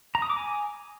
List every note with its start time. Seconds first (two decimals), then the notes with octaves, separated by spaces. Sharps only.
0.15 A#5
0.22 D#6
0.30 D6
0.37 G#5